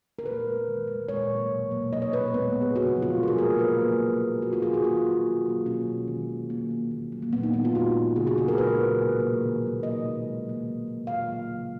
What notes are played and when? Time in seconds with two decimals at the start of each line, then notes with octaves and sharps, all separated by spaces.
0.19 A#4
0.26 A#2 B4
0.47 G#3
0.68 D#3
0.87 G#3
1.08 A#2 C#5
1.30 F#3 A#3
1.51 B2
1.71 F#3 A#3
1.93 B2 D#5
2.02 C#5
2.13 G#3 B4
2.34 A#2 B3
2.55 G#3
2.61 G#4
2.76 C#3 F#4
2.96 F3 G#3
3.03 F4
3.17 B2
3.23 A#4
3.28 G#4
3.38 F#3 A#3 A#4
3.59 A#2 B4
3.80 F#3 A#3
4.00 B2
4.22 F#3 A#3
4.42 D#3 F#4
4.53 F4
4.62 F#3 A#3 G#4
4.74 F#4
4.83 D#3 F4
5.04 F#3 A#3
5.25 B2
5.46 F#3 A#3
5.66 B2 C#4
5.88 G#3
6.08 D#3
6.29 A#3
6.50 B2 A#3
6.71 A#3
6.91 D#3
7.12 F#3 A#3
7.22 A#3
7.33 A#2 B3
7.43 D#4
7.53 G#3 D#4
7.65 F4
7.74 A#2 F#4
7.96 F3 A#3
8.16 C#3 G#4
8.27 F#4
8.37 G#3 G#4
8.48 A#4
8.58 A#2 B4
8.79 F#3 A#3
9.00 B2
9.20 A#3
9.42 D#3
9.62 F#3 A#3
9.82 B2 D#5
10.04 G#3
10.25 D#3
10.46 F#3 A#3
10.66 D#3
10.88 A#3
11.07 A#2 F5
11.29 F#3 A#3
11.49 C#3